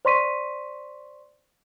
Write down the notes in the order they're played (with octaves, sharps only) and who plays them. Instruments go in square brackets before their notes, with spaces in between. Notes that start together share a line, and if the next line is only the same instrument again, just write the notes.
[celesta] C5 D5 C6 C#6 B6 D#7